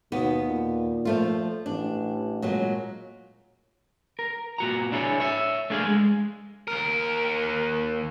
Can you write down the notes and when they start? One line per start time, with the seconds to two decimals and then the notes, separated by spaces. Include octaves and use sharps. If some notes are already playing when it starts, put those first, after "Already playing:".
0.12 D#2 B2 B3
0.47 A#2
1.05 F3 A3 F4
1.66 A1 D4
2.42 A#2 F#3 G#3
4.19 A#4
4.58 A#2 F#4 A#5
4.92 D4 E4 G#4 C#5
5.20 C#5 E5
5.70 A3 D4 G#4 F5
5.85 G#3
6.68 D#2 A#4